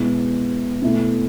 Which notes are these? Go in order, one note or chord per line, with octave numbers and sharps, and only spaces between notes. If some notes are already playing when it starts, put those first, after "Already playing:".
Already playing: B2 G#3 B3 E4
B2 A3 E4